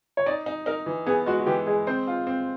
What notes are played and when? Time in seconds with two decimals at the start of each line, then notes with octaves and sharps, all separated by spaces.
0.17 C#5
0.26 D#4 D5
0.46 D#4
0.66 D#4 A#4
0.86 E3
1.06 B3 G#4
1.26 G#3 F#4
1.40 F#4
1.46 E3 G4
1.66 G#3 G#4
1.87 C4 C5
2.07 F4
2.27 C4